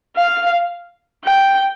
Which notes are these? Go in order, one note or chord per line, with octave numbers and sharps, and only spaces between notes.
F5
G5